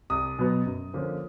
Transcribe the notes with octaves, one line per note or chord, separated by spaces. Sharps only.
C2 D#6
B2 F#3 B3
F#2
D3 F3 A#3 C#4